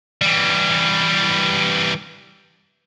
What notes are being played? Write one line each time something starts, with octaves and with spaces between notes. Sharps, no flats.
E3 G3